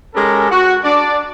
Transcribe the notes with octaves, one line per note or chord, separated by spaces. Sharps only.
G#3 C#4 G4 A4 A#4
F#4
D4 D5